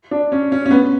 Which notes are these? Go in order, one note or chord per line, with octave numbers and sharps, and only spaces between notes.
D4
C#4
C#4
C#4
B3